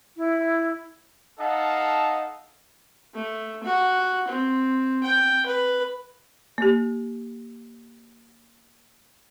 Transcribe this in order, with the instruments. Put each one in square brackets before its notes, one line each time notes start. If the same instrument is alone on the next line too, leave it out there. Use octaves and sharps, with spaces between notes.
[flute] E4
[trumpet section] D#4 A4 D#5 F5 F#5 A5
[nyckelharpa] A3
F#4
C4
G5
B4
[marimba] A#3 G4